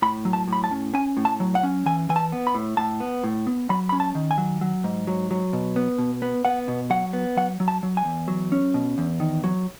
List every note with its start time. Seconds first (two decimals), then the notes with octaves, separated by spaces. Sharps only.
0.02 A2 B5
0.25 F#3
0.33 A5
0.48 A2 B5
0.64 A5
0.71 C#4
0.94 C#4 G#5
1.17 A2
1.25 A5
1.40 F#3
1.55 F#5
1.63 C#4
1.86 E3 G#5
2.09 E3 G#5
2.16 A5
2.32 B3
2.47 B5
2.54 A2
2.77 A2 A5
3.00 B3
3.24 A2
3.47 B3
3.70 F#3 B5
3.89 C#4 B5
4.00 A5
4.15 D#3
4.31 G#5
4.38 F#3
4.61 F#3
4.84 G#2
5.07 F#3
5.31 F#3
5.53 B2
5.76 B3
5.98 B2
6.22 B3
6.45 B3 F#5
6.68 B2
6.90 F#3 F#5
7.13 B3
7.37 F#3 F#5
7.60 F#3
7.68 A5
7.83 F#3
7.97 G#5
8.05 E2
8.28 F#3
8.52 C#4
8.74 B2
8.98 E2
9.20 D#3
9.44 F#3